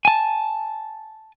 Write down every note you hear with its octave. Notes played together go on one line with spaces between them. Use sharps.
G#5 A5